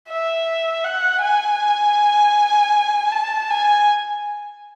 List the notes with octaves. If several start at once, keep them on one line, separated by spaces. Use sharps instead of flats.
E5
F#5
G#5
A5
G#5